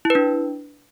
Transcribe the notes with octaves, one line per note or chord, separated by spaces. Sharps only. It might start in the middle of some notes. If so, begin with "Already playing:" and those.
E4
B4
D4